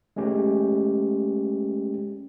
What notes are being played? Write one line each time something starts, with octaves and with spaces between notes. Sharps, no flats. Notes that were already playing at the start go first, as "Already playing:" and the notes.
G#3 A3 C#4 G4